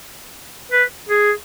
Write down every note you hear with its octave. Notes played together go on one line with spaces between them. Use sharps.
B4
G#4